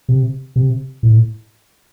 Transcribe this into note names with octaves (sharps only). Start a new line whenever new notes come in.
C3
C3
A2